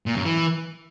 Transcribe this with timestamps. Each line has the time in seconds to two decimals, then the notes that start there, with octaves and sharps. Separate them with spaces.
0.06 A#2
0.15 F#2
0.24 E3